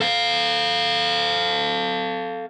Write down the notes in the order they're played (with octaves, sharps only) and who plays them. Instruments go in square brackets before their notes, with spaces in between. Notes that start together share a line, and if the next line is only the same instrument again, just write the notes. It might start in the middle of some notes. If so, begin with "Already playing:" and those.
[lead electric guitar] A4 F5